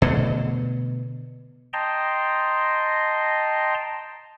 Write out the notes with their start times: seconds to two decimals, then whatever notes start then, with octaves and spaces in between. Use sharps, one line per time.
0.02 B2 D3 A3
1.73 D#5 G5 A5 A#5 C6